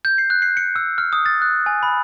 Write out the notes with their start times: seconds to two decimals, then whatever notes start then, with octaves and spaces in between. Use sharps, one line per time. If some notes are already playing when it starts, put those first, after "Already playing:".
0.05 G6
0.18 C7
0.30 F#6
0.42 C7
0.57 C#7
0.76 E6
0.98 F6
1.13 D#6
1.26 A6
1.42 F#6
1.66 G#5
1.83 B5